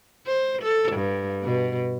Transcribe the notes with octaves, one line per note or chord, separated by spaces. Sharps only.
C5
A4
G2
B2